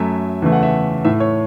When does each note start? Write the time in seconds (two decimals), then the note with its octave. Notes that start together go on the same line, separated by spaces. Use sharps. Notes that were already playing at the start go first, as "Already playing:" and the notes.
Already playing: F#2 F#3 A3 E5
0.42 E2 C#3 A3
0.52 F#5
0.63 E5
1.05 A2 A3 E5
1.20 C#5